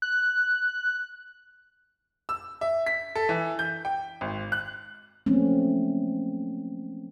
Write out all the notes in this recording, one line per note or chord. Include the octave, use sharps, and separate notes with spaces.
F#6
E6
E5
B6
A4
E3
G6
G5
G#1
F#6
F3 F#3 A3 A#3 C4 C#4